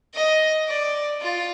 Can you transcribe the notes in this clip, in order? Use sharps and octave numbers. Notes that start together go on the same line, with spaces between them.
D#5
D5
F4